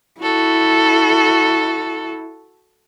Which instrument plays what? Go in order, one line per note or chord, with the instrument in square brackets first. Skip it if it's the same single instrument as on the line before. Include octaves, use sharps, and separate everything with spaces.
[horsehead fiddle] E4 [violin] F#4 A4